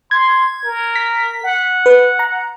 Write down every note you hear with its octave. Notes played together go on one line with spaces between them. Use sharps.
C6 G#6
A#4
B6
F#5
B4
A#5